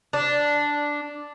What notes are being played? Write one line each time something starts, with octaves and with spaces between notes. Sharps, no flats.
D4